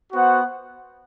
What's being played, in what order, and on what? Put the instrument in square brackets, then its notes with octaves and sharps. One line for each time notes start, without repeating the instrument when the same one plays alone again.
[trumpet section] B3 F#4 C5 F#5